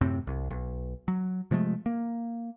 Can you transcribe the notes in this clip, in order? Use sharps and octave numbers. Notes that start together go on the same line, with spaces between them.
F#2 A2 C3 C4
C2
B1
F#3
C3 F3 G#3 A3
A#3